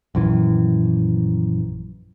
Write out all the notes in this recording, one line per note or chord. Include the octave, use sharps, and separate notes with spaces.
A#1 F#2 E3